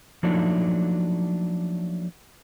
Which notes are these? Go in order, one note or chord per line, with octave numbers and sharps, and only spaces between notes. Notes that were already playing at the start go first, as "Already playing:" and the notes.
F3 F#3 A3 A#3 D4 D#4